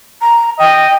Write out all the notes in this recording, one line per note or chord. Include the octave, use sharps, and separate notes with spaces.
A#5
D#5 G5